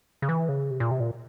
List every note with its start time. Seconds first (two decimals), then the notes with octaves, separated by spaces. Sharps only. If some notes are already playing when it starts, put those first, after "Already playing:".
0.22 C#3
0.29 E3
0.49 C#3
0.70 C3
0.80 A#2
0.91 C3
1.00 A#2